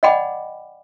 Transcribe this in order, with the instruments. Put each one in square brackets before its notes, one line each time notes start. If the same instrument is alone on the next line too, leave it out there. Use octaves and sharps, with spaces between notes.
[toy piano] D5 D#5 F#5 G5 B5 D6